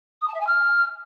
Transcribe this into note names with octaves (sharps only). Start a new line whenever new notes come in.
D#6
A5
E5
G#5
F6